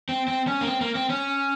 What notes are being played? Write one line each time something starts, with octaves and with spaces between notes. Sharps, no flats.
C4
C4
C#4
A#3
C4
A#3
C4
C#4